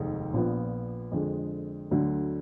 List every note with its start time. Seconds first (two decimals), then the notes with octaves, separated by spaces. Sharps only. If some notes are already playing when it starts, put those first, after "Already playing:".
Already playing: F1 D#2 D#3 G#3 D#4
0.33 A#1 A#2 F3 B3
1.12 F2 D3 G#3
1.91 D2 D3 F#3